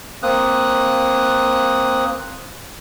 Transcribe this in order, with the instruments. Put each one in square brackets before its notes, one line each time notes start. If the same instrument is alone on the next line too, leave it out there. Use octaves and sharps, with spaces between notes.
[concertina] A#3 C4 D#6 F#6